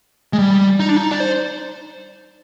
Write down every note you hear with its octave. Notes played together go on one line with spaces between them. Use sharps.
G#3
G3
D#4
D4
D#4
D5
C5